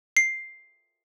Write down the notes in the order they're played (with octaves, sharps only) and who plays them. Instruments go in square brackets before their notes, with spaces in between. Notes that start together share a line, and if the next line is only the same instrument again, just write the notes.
[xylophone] C7